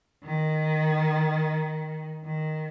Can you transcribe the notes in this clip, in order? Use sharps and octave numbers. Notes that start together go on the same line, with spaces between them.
D#3
D#3